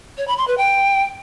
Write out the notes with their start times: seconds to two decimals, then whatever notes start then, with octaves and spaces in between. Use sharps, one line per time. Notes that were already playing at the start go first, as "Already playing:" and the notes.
0.18 C#5
0.28 B5
0.38 C6
0.48 B4
0.58 G5